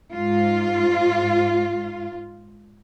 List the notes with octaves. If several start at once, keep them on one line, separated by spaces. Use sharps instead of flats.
G#2 F4